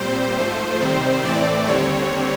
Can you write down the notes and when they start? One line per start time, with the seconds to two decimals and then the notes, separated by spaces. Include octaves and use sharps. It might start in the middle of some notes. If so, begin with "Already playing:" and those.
Already playing: A#2 G3 C4 C5
0.37 G#2 F3 A3
0.80 C3 D#3 G3 C4
1.24 A2 E3 A3 C4 D5
1.68 D#2 D3 G3 C4 C#5